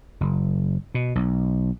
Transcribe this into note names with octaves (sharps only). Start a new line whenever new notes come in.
F#1
B2
B1